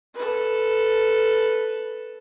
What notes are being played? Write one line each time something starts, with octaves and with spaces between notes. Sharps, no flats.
A4 B4